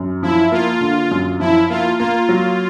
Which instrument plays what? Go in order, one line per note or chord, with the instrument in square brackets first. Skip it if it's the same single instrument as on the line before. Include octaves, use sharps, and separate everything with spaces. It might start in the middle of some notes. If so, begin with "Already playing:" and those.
Already playing: [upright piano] F#2
[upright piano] F3 [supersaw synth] E4
[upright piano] A#3 [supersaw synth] F4
[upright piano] D3
F#2
[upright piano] F3 [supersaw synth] E4
[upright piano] A#3 [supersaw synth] F4
[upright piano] A#3 [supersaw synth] F4
[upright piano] F#3